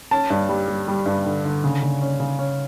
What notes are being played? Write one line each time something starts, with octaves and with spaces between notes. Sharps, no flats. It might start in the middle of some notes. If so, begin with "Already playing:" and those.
C#4 A5
G2
G3
G3
G3
G2
D3
D3
C#3
C#3
C#4
C#3
C#4